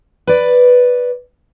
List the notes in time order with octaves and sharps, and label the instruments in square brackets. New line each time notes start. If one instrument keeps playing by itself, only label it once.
[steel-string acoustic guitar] B4 D5